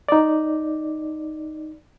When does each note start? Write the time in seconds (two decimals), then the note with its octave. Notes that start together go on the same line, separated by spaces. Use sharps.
0.09 D#4 D5